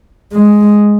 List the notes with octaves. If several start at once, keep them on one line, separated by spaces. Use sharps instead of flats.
G#3